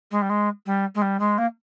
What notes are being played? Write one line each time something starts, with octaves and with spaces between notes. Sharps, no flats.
G#3
G3
G#3
G3
G#3
G3
G#3
A#3